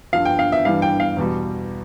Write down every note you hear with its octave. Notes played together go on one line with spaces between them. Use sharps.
G2 F3 F5
G5
F5
E5
G2 E3 G3 F5
G5
F5
E2 B2 G3